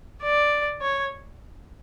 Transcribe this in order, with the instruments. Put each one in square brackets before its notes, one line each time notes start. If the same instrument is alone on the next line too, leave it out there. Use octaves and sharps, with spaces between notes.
[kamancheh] D5
C#5